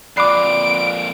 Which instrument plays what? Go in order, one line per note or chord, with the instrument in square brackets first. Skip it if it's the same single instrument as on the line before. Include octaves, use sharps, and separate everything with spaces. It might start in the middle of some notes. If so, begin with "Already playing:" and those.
[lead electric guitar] F2 A#2 [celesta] D5 B5 F#6 [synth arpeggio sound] D6 C7 [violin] D7